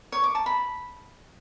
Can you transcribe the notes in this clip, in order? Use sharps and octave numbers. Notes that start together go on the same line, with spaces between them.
C#5
D6
A5
B5